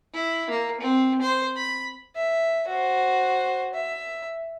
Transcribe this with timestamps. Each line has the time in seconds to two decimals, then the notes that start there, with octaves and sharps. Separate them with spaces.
0.14 E4
0.50 A#3
0.81 C4
1.22 C5
1.56 B5
2.16 E5
2.68 F#4 C5
3.74 E5